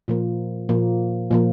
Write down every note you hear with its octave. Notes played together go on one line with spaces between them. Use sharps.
A#2 F3 A#3
A#2 F3 A#3
A#2 F3 A#3